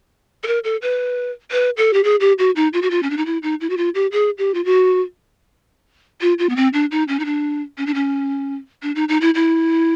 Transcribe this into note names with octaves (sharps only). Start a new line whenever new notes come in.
A4
A#4
A4
B4
B4
A4
G4
G#4
G4
F#4
D#4
F4
F#4
F4
C#4
D4
D#4
E4
D#4
E4
F#4
F4
G4
G#4
G4
F4
F#4
F4
F4
B3
C4
D4
D#4
C#4
D#4
D4
C#4
D4
C#4
D4
D#4
D#4
E4
E4